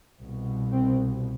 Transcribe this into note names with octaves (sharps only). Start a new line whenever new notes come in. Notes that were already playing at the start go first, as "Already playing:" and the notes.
C2 B2
C4